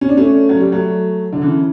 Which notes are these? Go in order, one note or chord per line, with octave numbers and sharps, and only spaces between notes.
C#4
D4
A3 C#4
F#3
G3
F#3 A3
D3
C#3 E3